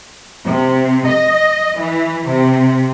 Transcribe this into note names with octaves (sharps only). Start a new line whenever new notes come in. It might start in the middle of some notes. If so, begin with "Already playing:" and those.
C3
D#5
E3
C3